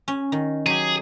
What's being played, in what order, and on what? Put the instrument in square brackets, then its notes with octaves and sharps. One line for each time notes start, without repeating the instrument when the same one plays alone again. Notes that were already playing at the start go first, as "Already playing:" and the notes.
[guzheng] C#4
D#3
[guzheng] F#3 G4 [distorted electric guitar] G#4